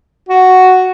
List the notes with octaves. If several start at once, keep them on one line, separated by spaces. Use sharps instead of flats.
F#4